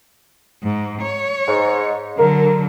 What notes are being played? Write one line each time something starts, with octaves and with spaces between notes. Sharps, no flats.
G#2
C#5
G#2
D3 F#3 A#4